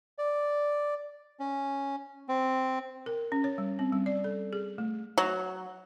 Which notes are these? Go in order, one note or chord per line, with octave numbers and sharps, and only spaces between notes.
D5
C#4
C4
A#4
C#4
C#5
G3
C4
G3
D5
A4
G#4
A3
F#3